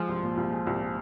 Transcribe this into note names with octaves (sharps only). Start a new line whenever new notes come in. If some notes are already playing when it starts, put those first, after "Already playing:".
Already playing: F3 G#3
C2
A#2
C2
G#3
C2
A#2